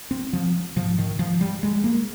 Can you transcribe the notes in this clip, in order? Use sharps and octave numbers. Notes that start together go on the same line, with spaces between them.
C4
F3
G#2 F3
D#3
F3
G3
G#3
A#3